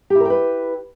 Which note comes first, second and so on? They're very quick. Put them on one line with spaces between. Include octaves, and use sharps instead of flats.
G4 E4 A#4 G5 B4